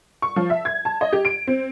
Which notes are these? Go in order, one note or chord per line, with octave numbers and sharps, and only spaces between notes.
C#6
F3
E5
G#6
A5
D#5
G4
D7
C4